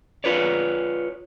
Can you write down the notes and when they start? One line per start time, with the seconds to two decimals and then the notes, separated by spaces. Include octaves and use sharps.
0.24 F4 B4 C#5 D5